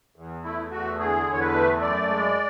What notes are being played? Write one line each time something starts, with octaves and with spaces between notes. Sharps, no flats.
E2
A3 E4
E2 F#4
D3 G#4
E2
C#5
B4
A3
F#2 D5
G#3